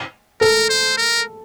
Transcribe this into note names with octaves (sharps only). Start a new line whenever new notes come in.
A4 A#4
C5
A#4